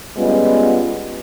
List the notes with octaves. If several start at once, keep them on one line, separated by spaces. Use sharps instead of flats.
G3 G#3 B3 C#4 F4